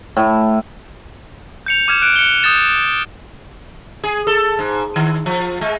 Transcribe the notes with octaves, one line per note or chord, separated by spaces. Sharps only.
A2
G6 C#7 F7
D6 F6 G#6 E7
F#6 D7
C#7 G7
D#6 G6 A6 E7
E7
G#4
A4
G#2
D#3
F3
G#3